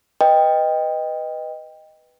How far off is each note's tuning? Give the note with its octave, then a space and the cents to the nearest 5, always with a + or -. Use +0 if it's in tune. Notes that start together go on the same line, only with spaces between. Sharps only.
B4 +0 D#5 +0 G5 +15